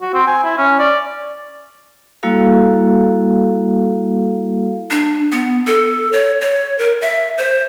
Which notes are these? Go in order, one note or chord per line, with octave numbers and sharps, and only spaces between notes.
F#4
C4
G#5
E4
C#4
D5
G3 A#3 E4 F#4 A4 F5
D4
B3
A4
C#5
C#5
A#4
E5
C5